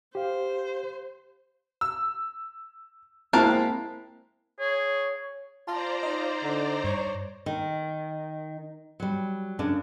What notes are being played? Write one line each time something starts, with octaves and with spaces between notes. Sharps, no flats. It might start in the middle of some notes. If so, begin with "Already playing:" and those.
G4 C5 F5
E6
G#3 A#3 C4 E4 A#4 A5
G#4 C#5
F4 C5 D5 A5 A#5
D#4 D#5
D3
G2 C#5
D#3
F#3 G3
F#2 C#3 D4